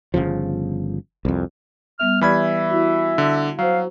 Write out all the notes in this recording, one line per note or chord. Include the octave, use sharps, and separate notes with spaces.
G1 D2 C#3 F3
C2 F2
G3 B3 E5 F6
E3 G4 D5 E5 B5 F6 G#6
E4 F#4
D3
F#3 F#4 C5 F5